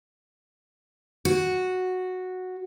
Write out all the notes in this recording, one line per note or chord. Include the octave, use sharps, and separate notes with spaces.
F#4